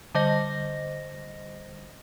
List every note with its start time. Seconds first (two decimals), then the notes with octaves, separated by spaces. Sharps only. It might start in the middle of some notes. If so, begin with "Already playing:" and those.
0.15 D3 G3 C5 D#5 A#6